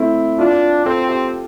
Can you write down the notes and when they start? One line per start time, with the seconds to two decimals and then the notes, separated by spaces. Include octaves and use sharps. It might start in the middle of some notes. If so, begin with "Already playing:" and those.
Already playing: A3 C4 E4
0.39 D4 F4
0.86 C4 A4
1.09 G4